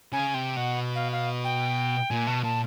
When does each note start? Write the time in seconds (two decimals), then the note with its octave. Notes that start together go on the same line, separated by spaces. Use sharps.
0.13 C#3 G#5
0.34 C3 G5
0.56 B2 F#5
0.95 F5
1.12 F5
1.44 G5
2.10 A#2 G#5
2.27 B2 A5
2.43 A#2 A5